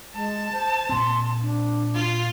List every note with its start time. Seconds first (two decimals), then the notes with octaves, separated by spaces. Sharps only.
0.15 G#3 A5
0.53 C5
0.89 A#2 C4 C6
1.42 D4
1.95 F4